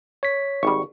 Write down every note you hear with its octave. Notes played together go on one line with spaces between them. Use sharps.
C#5 B6
G#1 G3 C#6